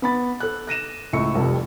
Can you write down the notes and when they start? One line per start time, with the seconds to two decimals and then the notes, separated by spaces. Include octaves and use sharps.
0.02 B3 B5 A6
0.40 A4 F#6
0.67 F#6 A#6 D#7 E7
1.13 C#2 A2 E5 C#6 C#7
1.33 F1 C2 F2